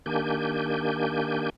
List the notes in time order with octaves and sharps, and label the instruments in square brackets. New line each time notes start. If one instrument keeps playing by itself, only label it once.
[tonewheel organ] D#3 A#3 D4 G4 G#5 G6